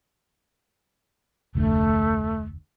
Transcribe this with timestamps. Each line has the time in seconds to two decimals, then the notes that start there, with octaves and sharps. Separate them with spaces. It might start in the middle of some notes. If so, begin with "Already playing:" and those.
1.55 F1 D2 A3